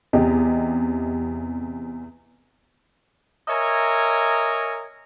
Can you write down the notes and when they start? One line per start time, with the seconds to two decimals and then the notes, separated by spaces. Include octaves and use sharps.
0.13 E2 C3 G4 D#5
3.48 A#4 C#5 D#5 E5 G#5 A#5